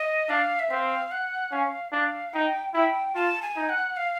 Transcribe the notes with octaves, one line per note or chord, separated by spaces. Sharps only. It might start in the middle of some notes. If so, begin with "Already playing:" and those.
Already playing: D#5
D4 F5
E5
C4 F5
F#5
C#4 F5
D4 F5
D#4 G5
E4 G5
F4 A5
G#5
D#4
F#5
F5